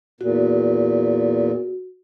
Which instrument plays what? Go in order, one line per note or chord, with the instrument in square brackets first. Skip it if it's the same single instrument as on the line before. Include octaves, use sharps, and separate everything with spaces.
[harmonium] E2 A#2 [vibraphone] F#4